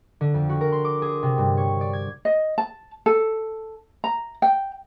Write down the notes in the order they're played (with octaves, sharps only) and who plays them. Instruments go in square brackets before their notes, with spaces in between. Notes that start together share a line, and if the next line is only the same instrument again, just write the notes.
[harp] D3
F2
F#4
A#4
C6
D6
G#4
C3
G2
C#5
D5
G#6
[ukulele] D#5
A5
A4
A#5
G5